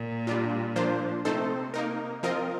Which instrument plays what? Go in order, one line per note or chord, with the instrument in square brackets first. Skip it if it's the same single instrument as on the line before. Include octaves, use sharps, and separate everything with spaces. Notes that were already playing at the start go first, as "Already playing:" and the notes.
Already playing: [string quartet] A#2
[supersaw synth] G3 D4 F4
F3 A#3 D4 F4 C5
[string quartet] C3 [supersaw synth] A3 C4 D#4 A4 C5
[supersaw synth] A#3 D#4 A#4
F3 C4 F4 A#4 D#5